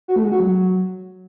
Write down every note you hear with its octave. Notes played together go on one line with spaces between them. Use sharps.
F#4
A3
G#3
F#4
F#3